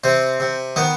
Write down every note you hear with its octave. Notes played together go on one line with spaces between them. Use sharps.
C3 C4
C3
D#3 B3